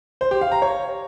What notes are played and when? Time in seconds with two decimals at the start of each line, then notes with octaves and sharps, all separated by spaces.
0.21 C5
0.31 G4
0.41 F5
0.52 A#5
0.62 C#5